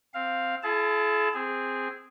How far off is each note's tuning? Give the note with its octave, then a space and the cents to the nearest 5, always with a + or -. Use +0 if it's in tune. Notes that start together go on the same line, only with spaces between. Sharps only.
C4 +0 F5 +0
E4 +45 G#4 +45 A5 +0
C4 +0 G#4 -10